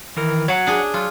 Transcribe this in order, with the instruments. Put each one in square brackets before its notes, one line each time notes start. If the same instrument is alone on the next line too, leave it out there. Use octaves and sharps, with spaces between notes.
[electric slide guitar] D#3 E3 A#4
[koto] F#3 [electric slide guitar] C#5 F#5
[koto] D4 G#4
[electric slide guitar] F#3 [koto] F4